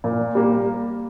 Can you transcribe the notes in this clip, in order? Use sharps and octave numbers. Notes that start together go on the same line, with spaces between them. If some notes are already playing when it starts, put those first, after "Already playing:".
A#2
G3 A#3